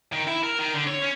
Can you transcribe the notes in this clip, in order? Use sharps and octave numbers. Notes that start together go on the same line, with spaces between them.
D#3
E4
A#4
D#3
D3
C#5
C#4